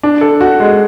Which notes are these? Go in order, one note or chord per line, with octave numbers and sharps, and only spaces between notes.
D4
A4
F#4
G#3